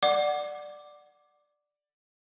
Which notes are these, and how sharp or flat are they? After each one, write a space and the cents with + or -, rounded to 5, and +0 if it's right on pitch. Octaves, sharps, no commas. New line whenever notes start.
D5 +10 F#5 +0 D6 +0